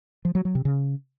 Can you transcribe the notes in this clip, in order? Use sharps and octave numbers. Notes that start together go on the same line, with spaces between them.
F3
F#3
F#3
C3
C#3